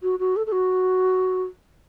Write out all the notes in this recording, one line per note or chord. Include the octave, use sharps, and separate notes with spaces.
F#4
F#4
A4
A4
F#4